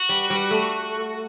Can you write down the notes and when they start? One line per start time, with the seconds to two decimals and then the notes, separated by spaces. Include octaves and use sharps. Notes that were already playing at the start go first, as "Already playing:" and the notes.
Already playing: F#4
0.09 G3
0.30 G3
0.50 A3